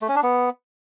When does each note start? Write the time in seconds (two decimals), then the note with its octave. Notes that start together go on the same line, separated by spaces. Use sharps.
0.02 A3
0.09 C#4
0.16 D4
0.23 B3